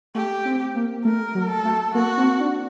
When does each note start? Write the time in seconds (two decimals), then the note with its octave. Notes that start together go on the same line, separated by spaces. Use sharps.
0.15 A3 G4
0.45 C4
0.75 A#3
1.05 A3 A#4
1.35 F#3
1.50 A4
1.65 A3
1.94 A#3 F#4
2.18 C4
2.40 D4